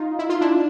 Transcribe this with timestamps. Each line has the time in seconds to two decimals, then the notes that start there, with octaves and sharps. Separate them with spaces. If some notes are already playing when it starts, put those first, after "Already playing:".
Already playing: D#4 F4
0.19 E4
0.29 F4
0.41 D4 E4